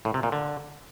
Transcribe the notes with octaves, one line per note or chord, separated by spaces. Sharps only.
A2
C3
A#2
D3